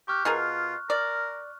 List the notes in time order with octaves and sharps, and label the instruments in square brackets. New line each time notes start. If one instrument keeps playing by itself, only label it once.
[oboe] G4 [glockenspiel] C#6 F6 F#6
[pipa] B2 G#4 A#4 [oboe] F4
[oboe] A#4 [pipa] D5